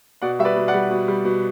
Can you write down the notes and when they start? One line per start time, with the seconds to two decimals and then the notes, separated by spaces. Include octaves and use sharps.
0.22 B2 D5 F#5
0.39 G3 E5
0.45 B4 D5
0.56 B2
0.68 D5 F#5
0.74 G3
0.90 B2
1.08 G3
1.25 B2